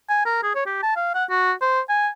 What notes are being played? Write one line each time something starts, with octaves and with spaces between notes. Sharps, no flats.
G#5
A#4
G#4
C#5
G4
A5
F5
F#5
F#4
C5
G#5